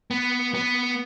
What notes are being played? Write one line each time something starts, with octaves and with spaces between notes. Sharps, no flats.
B3
B3